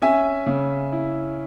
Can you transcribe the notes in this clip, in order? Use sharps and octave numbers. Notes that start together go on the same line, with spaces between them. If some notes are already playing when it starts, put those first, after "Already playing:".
C#4 E5 G#5
C#3
E4